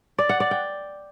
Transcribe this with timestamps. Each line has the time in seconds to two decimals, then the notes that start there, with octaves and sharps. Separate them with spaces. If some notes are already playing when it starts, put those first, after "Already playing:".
0.19 D5
0.29 F#5
0.40 D5
0.51 G5